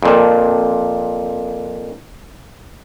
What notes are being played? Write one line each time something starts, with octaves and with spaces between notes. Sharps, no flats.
F2 A#2